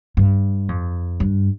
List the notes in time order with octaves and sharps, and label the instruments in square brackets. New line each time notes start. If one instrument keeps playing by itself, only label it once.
[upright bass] G2
F2
G2